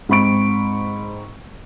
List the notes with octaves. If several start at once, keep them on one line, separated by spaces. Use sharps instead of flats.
G#2 C4 B5 C#6 D7